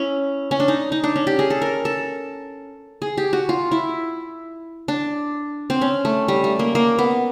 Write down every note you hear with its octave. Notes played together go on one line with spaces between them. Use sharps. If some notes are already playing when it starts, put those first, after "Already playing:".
Already playing: C#4 E4
C#4
D4
D#4
D#4
D4
C#4
G4
G#4
A4
A#4
A4
G#4
G4
F#4
F4
E4
D4
C4
C#4
A3
G3
A3
A#3
A#3
B3